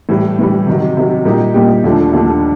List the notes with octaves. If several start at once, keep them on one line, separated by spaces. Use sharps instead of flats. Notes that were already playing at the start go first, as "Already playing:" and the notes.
A2 E3 G3
A2 E3 G3
C3 D#3 F#3
C3 D#3 F#3
A#2 G3 A#3 D#4 G4
A#2 G3 A#3 D#4 G4
D#2 D3 F3 A3 D4
D#2 D3 F3 A3 D4